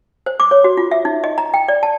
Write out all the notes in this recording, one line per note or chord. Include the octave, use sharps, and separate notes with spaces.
C5
D6
C#5
F#4
F4
E5
D#4
D#5
A#5
G5
D5
A5